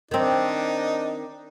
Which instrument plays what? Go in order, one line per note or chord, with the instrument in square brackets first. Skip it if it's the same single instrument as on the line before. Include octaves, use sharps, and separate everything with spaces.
[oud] D#3 C4 [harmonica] D4 D#4